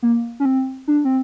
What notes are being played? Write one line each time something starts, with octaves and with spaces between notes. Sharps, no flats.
A#3
C#4
C4
D4
C4